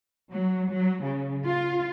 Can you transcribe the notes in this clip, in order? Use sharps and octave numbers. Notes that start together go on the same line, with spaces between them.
F#3
F#3
C#3
F4